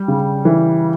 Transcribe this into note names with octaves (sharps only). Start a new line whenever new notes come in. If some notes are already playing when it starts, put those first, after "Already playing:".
Already playing: G3
C#3
E3